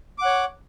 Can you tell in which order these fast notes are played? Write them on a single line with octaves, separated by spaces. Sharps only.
D6 F#5 C#5